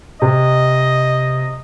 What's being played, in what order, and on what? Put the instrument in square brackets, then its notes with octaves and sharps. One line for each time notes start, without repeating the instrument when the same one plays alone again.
[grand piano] C3 [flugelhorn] D#5